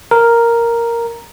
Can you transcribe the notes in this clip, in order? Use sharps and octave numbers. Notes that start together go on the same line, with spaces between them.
A#4